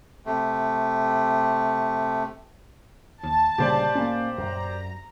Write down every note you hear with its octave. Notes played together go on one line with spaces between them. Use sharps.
C3 A3
D#2 A5
D2 A#2 C#3 G3 G4 C5 D5
A#3 C#4
F#2 A#5